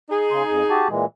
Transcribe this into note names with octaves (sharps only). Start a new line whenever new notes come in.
D#4 G#4
C#3 C6
F2
F#4 G4 A5
A#2 E3 G#3